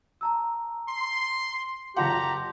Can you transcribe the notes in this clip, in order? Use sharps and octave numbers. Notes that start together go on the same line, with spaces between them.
A5 A#5 E6
C6
F#1 F4 G4 F#5 A5 A#5 C6